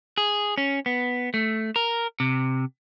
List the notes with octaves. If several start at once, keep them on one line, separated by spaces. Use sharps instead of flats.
G#4
C#4
B3
A3
A#4
C3